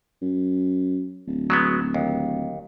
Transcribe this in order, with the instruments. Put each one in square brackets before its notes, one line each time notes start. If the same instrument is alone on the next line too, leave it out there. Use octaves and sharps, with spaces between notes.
[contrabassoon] F#2
D1
[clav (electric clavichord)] F#3 G#3 B3
D#2